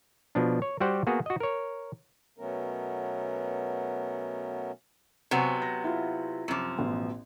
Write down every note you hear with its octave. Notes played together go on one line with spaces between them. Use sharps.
B2 F3 D4
C#5
G3 F#4 G4 C5 F#5
A#3 B3 F#4 G#4
F#4 D#5
A#4 C#5
B2 F#3 A3 B3 C#4 A#4
C3 F#3 B3 C5 F#5 G#5
A#6
E4 F4 F5
F#2 C3 F3 D6
A1 B2